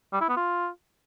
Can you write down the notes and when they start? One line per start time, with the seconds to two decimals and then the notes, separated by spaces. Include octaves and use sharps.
0.13 G3
0.21 E4
0.29 B3
0.37 F4